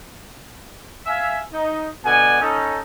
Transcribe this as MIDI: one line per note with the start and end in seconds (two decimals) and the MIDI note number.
1.06 1.40 76
1.06 1.40 77
1.06 1.40 80
1.53 1.88 63
2.05 2.41 47
2.05 2.41 50
2.05 2.41 74
2.05 2.41 78
2.05 2.41 80
2.41 2.80 61
2.41 2.80 63
2.41 2.80 69